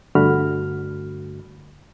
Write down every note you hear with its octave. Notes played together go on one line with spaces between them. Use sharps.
G2 D3 A3 F#4 B5 F6